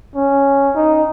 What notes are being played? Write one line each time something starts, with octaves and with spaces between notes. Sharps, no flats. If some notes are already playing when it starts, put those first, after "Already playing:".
C#4
D#4